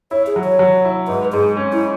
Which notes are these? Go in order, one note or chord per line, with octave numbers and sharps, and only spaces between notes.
E4 C#5
G#4
F#3
C#5
F#3
E4
G#2 B4
G#2 G#4
C#4
E4